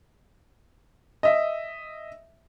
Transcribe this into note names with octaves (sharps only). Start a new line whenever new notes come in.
D#5 E5